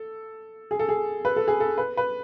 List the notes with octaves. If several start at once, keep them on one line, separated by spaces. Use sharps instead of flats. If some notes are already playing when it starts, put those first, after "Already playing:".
Already playing: A4
G#4
A4
G#4
B4
A4
G#4
A4
B4
B4